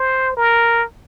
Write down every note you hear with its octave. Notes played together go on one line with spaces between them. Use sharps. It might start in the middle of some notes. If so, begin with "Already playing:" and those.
Already playing: C5
A#4